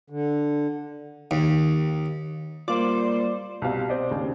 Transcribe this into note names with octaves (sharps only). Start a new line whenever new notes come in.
D3
D#2
G3 A#3 F4 C5 D5
C2 B2 C4 F5
C4 C5 D5 D#5
D#2 C#3